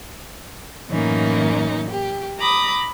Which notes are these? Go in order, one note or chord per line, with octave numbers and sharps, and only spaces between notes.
F#2 A2 E3 A#3 C#4 D#4
G4
A#5 B5 D6 D#6